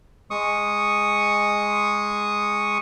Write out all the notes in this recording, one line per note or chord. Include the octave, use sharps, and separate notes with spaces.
G#3 C#6 D#6